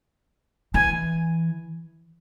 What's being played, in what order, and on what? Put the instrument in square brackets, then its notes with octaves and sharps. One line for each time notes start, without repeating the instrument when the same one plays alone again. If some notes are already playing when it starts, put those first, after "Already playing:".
[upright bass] E3 [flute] G#5